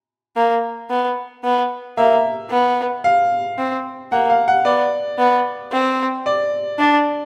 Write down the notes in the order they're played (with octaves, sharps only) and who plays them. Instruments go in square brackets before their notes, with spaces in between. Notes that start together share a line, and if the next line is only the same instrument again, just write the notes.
[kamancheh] A#3
B3
B3
[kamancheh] A#3 [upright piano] E5
[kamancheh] B3
[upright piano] F5
[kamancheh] C4
[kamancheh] A#3 [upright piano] F#5
[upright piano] F5
F#5
[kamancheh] B3 [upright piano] D5
[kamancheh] B3
C4
[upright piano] D5
[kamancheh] D4 [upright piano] D5